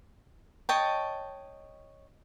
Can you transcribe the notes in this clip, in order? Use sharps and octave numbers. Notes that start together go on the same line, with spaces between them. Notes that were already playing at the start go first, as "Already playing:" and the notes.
C#5 D#5 G5 A5